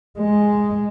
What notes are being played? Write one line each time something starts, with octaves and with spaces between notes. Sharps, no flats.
G#3